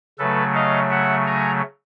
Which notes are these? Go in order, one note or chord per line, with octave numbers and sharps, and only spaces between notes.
C#3 F#3 A3 A4 B4
D#5 F5
E5 F#5
G#5 A#5